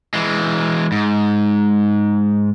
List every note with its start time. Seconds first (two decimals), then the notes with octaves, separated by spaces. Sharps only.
0.14 E3 G#3
0.92 G#2